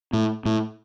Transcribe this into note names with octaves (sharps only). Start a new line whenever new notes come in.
A2
A2